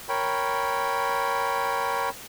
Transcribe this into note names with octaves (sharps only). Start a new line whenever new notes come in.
A#4 C#5 G5 B5